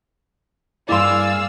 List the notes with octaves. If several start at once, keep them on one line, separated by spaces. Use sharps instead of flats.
G2 A#3 E4 G#4 D5 F5 C6 E6